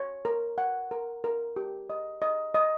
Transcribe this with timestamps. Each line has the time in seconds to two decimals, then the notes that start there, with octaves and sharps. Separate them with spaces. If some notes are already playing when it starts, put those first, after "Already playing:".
Already playing: C#5
0.25 A#4
0.58 F#5
0.91 A#4
1.24 A#4
1.56 G4
1.90 D#5
2.22 D#5
2.55 D#5